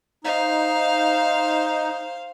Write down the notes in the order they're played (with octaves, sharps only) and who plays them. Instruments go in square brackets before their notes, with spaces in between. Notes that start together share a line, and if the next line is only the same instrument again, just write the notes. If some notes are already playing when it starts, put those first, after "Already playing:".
[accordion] D#4 [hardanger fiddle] C5 F5